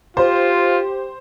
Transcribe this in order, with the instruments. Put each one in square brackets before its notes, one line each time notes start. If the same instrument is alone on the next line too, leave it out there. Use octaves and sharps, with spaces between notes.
[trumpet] F4 [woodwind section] G4 [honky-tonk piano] C5